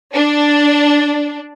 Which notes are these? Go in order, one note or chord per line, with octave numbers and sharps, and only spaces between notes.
D4